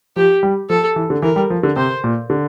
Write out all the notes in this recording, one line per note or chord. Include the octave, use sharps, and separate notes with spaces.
F3 G4
G3
F3 A4
E3
D3
E3 A#4
G3
F3
D3
C3 C5
A#2
D3